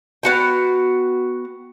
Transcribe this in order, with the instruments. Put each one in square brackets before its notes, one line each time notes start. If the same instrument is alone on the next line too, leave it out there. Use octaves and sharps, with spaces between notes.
[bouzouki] B3 F#4 G5